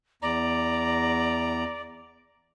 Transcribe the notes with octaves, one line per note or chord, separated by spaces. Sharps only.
E2 D5 A#5